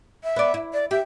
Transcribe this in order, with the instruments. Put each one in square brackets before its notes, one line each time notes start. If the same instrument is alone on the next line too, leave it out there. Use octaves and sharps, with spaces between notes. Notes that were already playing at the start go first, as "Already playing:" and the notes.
[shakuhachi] E5
[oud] B3 D5
E4
[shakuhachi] D5
[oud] G4 [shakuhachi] E5